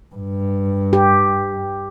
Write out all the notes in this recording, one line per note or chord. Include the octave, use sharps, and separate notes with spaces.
G2
G4